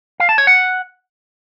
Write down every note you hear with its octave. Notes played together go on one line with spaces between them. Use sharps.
F5
A5
C#5
F#5